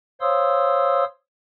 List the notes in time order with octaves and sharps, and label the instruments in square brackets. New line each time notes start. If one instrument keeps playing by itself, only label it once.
[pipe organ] C5 C#5 F5 C6 D#6 E6